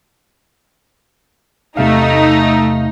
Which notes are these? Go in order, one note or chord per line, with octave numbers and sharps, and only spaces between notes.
E2 C3 A3 D#4 F5